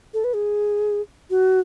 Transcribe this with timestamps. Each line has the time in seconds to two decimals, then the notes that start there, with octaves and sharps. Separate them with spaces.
0.14 A4
0.24 B4
0.35 G#4
1.30 F#4